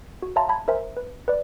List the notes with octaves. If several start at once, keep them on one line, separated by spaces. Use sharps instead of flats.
F#4
C#5 E5 F5 A5 A#5 C6
G#5 A5 B5 G#6
A#4 C5 E5 G#5 A#5
B4
B4 D5